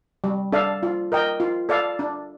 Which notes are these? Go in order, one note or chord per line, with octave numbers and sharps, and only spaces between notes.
G3
D4 A4 D5 F5
F4
A#4 D#5 G5
F4
A4 D5 F5
D4